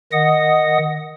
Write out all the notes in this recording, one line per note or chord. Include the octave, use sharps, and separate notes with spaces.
D#3 D#5 F#5 D#6